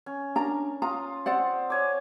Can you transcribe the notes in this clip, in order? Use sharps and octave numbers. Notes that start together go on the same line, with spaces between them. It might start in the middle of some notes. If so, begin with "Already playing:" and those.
C#4
D4 A#4 A#5
F4 A#5 D#6
C4 C5 D5 F#5
C#5 G#5 D6